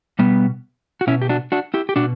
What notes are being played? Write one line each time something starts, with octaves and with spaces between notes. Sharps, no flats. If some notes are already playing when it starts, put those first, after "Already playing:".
B2 G3 B3
F#4
B2 C#4 E4
G4
D4 F#4
D4 F#4
E4 G4
G4
B2 D4 F#4